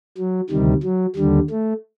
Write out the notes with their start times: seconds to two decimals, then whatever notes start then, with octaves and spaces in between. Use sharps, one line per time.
0.18 F#3
0.50 D2 C3 D#3 G3
0.83 F#3
1.16 D#2 D3 G3
1.50 A3